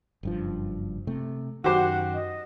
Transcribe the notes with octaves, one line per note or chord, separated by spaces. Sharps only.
F#1 G2 F3
C3 A3
F#2 D#3 F#4 G4 C5 F#5
D#5